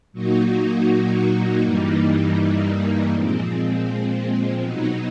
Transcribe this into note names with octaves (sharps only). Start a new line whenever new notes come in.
A#2 F#3 A#3 D#4 F#4
G2 E3 G3 A#3 D#4
A#2 F3 G#3 C4
B2 F#3 B3 D#4